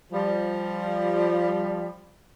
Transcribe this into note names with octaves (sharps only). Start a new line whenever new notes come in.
F3 G3